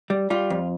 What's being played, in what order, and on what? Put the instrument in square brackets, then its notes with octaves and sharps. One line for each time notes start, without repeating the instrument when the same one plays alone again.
[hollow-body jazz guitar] G3
G3 F4
F2